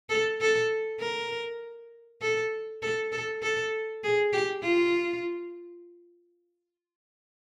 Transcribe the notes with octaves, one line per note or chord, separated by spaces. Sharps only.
A4
A4
A#4
A4
A4
A4
A4
G#4
G4
F4